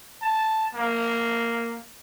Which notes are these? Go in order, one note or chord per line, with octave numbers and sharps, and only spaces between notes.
A5
A#3